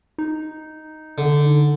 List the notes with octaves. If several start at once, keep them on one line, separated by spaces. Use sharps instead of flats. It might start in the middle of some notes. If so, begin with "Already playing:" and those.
D#4
D3